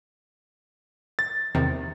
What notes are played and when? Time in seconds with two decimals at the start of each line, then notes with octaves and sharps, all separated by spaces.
1.19 A6
1.55 E2 C3 D#3